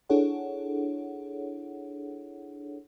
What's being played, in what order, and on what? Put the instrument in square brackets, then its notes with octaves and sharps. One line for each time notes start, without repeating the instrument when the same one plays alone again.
[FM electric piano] D4 E4 G#4 A4 C#5 F#5